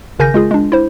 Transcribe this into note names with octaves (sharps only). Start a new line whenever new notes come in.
G#1 C#3 A#4 G#5 G6 A#6
G#3 F4 G#4
G#3 D4
E4 C5